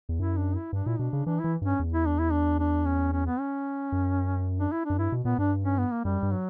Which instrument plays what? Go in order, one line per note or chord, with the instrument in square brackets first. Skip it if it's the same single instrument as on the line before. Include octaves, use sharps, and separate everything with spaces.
[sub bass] E2
[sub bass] F#2 [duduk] E4
[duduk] D4
E4
[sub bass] G2 [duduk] D4
[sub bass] A#2 [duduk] E4
[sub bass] B2 [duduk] D4
[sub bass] C#3
[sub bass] E3 [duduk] D4
[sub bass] E3 [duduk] E4
[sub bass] G2 [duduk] C#4
[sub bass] E2
[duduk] E4
D4
E4
D4
D4
C#4
C#4
B3
C#4
[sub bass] F#2
[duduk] D4
E4
[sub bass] F#2 [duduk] D4
[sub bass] G2 [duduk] E4
[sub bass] B2
[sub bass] A#2 [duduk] B3
[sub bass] G2 [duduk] D4
[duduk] C#4
B3
A#3
[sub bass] F#2 [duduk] G3
[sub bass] G2
[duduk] F#3